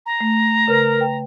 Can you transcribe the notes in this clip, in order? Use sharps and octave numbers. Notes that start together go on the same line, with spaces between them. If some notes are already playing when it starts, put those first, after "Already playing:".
A#5
A3
C#3 A#4 B4 A#6
B4 G5